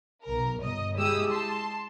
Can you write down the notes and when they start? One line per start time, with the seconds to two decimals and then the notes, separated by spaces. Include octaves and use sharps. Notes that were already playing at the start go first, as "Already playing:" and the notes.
0.25 B1 A#4
0.61 G1 D#5
0.96 G#3 E4 G4 D#6 E6
1.29 A5 C6